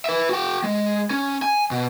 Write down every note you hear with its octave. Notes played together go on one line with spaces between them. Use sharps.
B4 E5
F#4 G5
G#3
C#4
G#5
B2